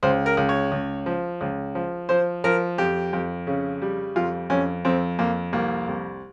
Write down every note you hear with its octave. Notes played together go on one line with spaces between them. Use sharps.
C#2 C5
A#4
C#2
C#5
C#2
F3
C#2
F3
F3 C5
F3 A#4
F2 G4
F2
C#3
G3
F2 F4
F2 C#4
F2 C4
F2 A#3
C2 A#3
C2